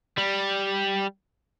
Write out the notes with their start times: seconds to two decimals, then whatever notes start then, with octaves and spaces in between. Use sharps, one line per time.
0.18 G3